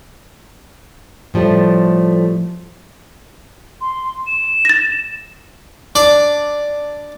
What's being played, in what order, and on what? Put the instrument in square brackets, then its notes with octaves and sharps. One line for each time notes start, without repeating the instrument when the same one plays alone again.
[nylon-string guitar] A2 F3 G3 A3
[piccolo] C6
E7
[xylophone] A6 A#6
[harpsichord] D4 D5